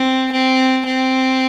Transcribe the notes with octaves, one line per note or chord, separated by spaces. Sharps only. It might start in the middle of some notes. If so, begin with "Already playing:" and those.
Already playing: C4
C4
C4